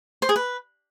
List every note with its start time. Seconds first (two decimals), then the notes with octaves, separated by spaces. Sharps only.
0.22 C5
0.29 G#4
0.36 B4